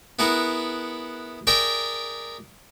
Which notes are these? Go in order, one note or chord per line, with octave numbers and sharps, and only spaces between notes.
B3 E4 G#4 A#4 F#5
G#4 A#4 D5 E5 G5 A#5